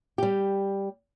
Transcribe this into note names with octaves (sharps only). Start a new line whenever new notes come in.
G3 G4